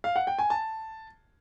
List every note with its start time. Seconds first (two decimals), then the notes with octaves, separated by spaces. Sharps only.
0.04 F5
0.16 F#5
0.27 G5
0.38 G#5
0.50 A5